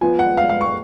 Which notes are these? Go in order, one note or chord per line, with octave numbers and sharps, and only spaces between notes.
F3 B3 F4 G#5
F#5
F5
F5
C#6